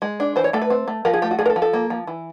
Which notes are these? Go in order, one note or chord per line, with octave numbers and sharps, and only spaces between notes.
G#3
D4
E3 C5
C#5
A3 A4
B4
C4
A3
F3 A#4
G#4
A3 G4
F#4
F3 G#4
A#4
A4
F3
A4
A#3
F3
E3